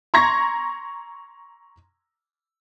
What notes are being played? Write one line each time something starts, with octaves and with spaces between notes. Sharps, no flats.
A#5 C6 C#6 G#6 A#6